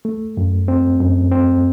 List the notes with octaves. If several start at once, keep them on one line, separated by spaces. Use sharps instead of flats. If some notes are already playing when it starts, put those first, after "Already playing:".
A3
F#2
C4
F#2
C4